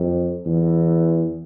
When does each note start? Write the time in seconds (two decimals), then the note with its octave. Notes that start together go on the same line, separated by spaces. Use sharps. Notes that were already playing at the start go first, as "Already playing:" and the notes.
Already playing: F2
0.46 E2